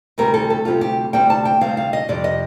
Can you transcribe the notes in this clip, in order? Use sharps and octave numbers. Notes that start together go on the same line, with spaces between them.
D2 C3 G3 C4 A#4
A4
A4
D2 C3 G3 C4 F4
G4
D2 C3 G3 C4 G5
A5
G5
D2 C3 G3 C4 F5
F5
D#5
F2 C3 G3 D5
D#5